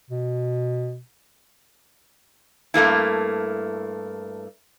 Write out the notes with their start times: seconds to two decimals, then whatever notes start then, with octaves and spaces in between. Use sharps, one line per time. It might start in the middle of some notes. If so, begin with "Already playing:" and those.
0.10 B2
2.74 G2 A3 A#3 E4